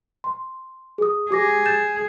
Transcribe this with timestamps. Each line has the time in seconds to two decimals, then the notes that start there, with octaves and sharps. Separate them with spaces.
0.24 C6
0.98 G#4 D#6
1.31 G4 G#4 D6 A#6
1.66 G6 A6 E7